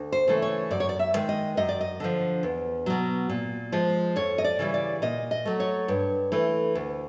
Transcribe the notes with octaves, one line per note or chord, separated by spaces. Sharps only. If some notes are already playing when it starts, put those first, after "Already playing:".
Already playing: D2
C5
C#3 E3 A3
C#5
F#2 D5
C#5
D5
E5
D#3 G#3
D#5
F#2 D#5
D5
D#5
D3 F3
E2
B2 F#3
A#2
F3 G#3
F2 C#5
D#5
D5
C#3 E3 G3
D5
A#2 D#5
D#5
F#3 A3
C#5
G2
E3 A3
D2